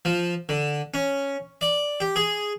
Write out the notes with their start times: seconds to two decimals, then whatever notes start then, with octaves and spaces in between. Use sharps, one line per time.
0.05 F3
0.49 D3
0.94 C#4
1.61 D5
2.00 G4
2.16 G#4